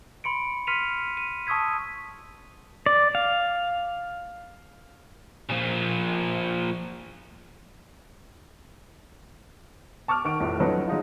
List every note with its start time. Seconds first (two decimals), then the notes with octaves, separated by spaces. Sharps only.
0.24 B5 C6 C#7 D7
0.67 C6 F6 B6 C#7 D#7 F7
1.17 D#7
1.47 A5 C#6 D#6 E6 G#6 B6
2.86 D5
3.15 F5
5.49 A#2 F3
10.08 A5 C#6 D6 F6
10.24 D#3 F#5 C#6 D7
10.40 F1 A#1 A2
10.60 F3 F#3 C#4 D#4 A4 B4
10.88 F#3 G#3 D#4 F4